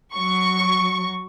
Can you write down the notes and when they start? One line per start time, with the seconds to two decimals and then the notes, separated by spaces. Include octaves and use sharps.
0.13 F#3 C#6